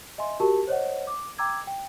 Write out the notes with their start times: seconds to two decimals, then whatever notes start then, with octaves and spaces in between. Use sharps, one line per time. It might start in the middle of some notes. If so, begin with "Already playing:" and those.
0.18 D#5 E5 G#5 C6
0.40 F#4 G4 A#4 A5
0.67 C5 C#5 D#5 F#5
1.07 D6
1.38 G5 A#5 D6 E6 G#6
1.67 G5